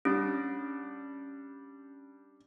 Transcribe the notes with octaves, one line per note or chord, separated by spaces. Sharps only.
G3 C#4 D4